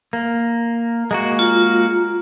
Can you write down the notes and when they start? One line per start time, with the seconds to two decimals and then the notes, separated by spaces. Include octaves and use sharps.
0.13 A#3
1.11 G#3 A#3 F#4
1.39 F4